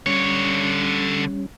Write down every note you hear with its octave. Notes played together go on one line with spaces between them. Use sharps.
D3 G3 C#4 C#5